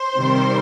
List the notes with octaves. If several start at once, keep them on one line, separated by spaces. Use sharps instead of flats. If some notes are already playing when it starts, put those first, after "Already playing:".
Already playing: C5
C3 D#3 G3